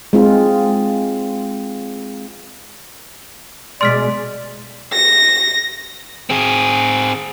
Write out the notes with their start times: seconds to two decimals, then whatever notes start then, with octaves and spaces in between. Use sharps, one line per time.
0.13 G#3 C4 F4
3.81 B2 G#3 D5 C6 F6 B6
4.94 A#6
6.30 C4 G#4